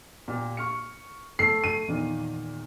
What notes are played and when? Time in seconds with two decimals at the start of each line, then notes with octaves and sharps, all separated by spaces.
0.28 A#2 G4
0.57 C#6 F6 C#7
1.39 A3 A4 A5 C7
1.64 D#7
1.87 E2 A#2 D#3